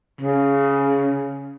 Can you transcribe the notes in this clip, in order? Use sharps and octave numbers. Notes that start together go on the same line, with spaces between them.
C#3